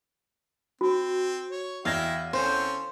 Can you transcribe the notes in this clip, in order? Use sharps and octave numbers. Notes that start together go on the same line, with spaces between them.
C4 F#4
C#5
E2 E4 E5 F5 G5 G#6 A#6
C4 C#4 A4 C5